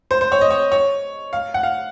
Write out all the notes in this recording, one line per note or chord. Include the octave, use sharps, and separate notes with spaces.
C5
C5
C#5
D#5
C#5
C#5
F5
F#5
F5